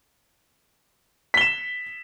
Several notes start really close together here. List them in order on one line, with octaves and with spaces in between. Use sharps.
B6 G7 E7